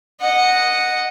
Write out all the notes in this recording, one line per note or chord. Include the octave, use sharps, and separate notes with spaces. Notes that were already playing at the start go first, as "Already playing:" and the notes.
D#5 F#5